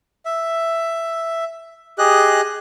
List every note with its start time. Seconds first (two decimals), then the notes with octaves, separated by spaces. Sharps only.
0.26 E5
1.98 G4 G#4 D#5 F#6